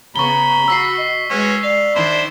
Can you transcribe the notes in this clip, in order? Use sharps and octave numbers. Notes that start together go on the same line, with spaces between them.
C#3 B3 A#5 B5 C#6 G7
F#4 E6 B6 C7
D#5
G#3 C#4 F#4 B4
D5 F5
D#3 D4 E4 C5